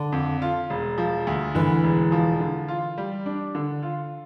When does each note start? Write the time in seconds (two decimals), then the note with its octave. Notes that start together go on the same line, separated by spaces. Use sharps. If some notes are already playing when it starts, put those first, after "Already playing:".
Already playing: D3
0.12 F2
0.42 F4
0.70 E1
0.98 F3
1.27 D2
1.55 D3 E3
1.84 E1
2.12 F3
2.40 D3
2.68 F4
2.98 G3
3.26 D4
3.55 D3
3.83 F4